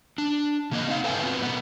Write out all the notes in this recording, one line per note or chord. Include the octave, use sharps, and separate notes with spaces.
D4
C#3 A#3 D#5
C4 D#4 F5
A4 B4 E5 G5 G#5
B3 C4 F4 F#4 B4
B2 A3 B3